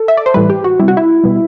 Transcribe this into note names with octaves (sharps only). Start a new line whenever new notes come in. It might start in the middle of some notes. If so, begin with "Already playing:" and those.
Already playing: A4
E5
D5
C5
A2 E3 G3 B4
G4
F#4
C3 G3 E4
F#4
E4
B2 G3